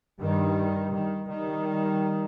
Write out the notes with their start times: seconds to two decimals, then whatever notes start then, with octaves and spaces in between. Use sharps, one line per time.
0.22 G2 D#3 G3
0.94 D#3
1.29 D#3 G3